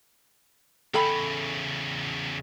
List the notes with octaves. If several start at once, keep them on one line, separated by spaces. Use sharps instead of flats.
E2 C#3 A4 G5 B5